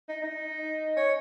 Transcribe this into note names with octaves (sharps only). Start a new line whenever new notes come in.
D#4
D#4
C#5